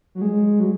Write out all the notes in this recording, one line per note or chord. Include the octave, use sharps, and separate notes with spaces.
F#3
G#3
F#3